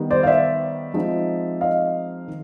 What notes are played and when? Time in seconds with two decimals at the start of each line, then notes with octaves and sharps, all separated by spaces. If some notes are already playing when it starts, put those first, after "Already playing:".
Already playing: D#3 G3 B3 D#4
0.11 C5 D5
0.23 F5
0.26 D5 E5
0.94 F3 G#3 C4 D#4
1.61 D#5 F5
2.28 D#3